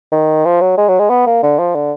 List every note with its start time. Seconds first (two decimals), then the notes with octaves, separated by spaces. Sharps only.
0.12 D#3
0.45 F3
0.61 F#3
0.77 G#3
0.88 F#3
0.99 G#3
1.10 B3
1.26 A#3
1.43 D3
1.59 F3
1.75 D3